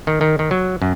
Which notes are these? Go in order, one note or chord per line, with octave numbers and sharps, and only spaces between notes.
D#3
D#3
D#3
F#3
F#2